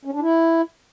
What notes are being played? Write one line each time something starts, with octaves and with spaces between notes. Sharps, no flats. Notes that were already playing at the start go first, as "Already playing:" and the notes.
C#4
D4
E4